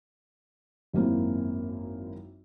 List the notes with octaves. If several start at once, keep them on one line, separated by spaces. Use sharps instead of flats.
G#1 F#2 A#3 C4 E4